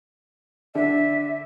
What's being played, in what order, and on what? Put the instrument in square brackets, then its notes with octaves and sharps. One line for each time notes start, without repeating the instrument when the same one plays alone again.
[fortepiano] D3 D4 [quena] E5